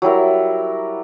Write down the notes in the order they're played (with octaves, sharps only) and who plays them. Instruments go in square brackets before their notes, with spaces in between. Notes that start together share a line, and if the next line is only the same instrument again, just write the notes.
[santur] F#3 G3 E4 A#4